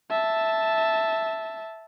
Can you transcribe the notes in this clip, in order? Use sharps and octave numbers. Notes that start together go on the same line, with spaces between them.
E5 A5